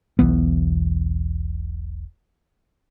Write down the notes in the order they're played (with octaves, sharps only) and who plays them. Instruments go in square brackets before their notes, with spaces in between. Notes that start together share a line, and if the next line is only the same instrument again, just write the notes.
[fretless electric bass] E1 B1 E3 B3